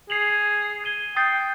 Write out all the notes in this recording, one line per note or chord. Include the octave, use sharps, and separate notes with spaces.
G#4 C7 F7 F#7
G#6 D#7 G7
G5 D#6 A6 C7